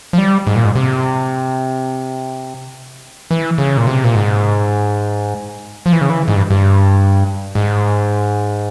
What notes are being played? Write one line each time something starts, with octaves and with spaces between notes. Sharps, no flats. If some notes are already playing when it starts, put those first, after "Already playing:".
F3
G3
G#2
A#2
G#2
C3
E3
C#3
A#2
C3
A#2
G#2
F3
E3
C#3
E3
G#2
G2
G2
G#2